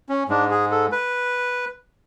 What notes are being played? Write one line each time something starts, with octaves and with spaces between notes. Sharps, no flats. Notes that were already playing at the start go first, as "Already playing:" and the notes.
C#4
G#2 G#3 D4
G#4
A4
B4